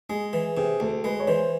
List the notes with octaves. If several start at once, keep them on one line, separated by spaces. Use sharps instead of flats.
G#3 G#4
E3
C3 G#4
D2 A4
G#3 B4
C#5
E3 C5